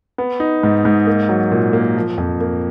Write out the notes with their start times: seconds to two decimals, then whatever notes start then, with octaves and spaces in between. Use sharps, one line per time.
0.18 B3
0.40 D#4
0.63 G#2
0.85 G#2
1.07 A#3
1.29 F#3
1.52 A#2
1.73 A#3
1.97 F3
2.18 F2
2.40 A#3